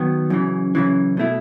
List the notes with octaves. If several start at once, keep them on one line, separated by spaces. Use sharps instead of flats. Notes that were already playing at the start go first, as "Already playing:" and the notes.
Already playing: D#3 F#3 B3
F#2 C#3 E3
F#2 C#3 E3
B2 A3 E4